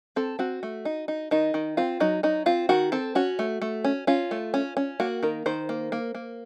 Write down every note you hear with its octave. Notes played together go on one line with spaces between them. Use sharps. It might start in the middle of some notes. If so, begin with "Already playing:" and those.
C4 A4
C4 F#4
A3
D#4
D#4
D#3 D#4
D#3
C4 F4
F#3 D#4
F#3 D#4
C4 F4
D#3 F#4
C4 A4
C#4 F#4
A3
A3
C#4
C#4 F4
A3
C#4
C#4
A#3 F#4
D#3 A#4
D#3 C5
A#3
A#3
A#3